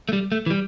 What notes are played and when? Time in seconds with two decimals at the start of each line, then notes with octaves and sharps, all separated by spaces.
0.09 A3
0.13 G3
0.32 A3
0.46 E3
0.51 G3